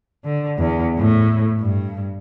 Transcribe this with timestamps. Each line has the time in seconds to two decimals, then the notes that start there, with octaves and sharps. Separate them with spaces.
0.24 D3
0.58 E2
0.99 A2
1.61 G2